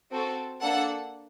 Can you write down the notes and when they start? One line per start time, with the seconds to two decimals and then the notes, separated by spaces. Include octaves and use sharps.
0.11 C4 F#4 A4
0.61 A#3 D4 A4 F#5